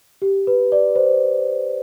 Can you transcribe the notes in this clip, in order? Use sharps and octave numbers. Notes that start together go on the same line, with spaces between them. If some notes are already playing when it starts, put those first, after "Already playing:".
G4
B4
D5
C5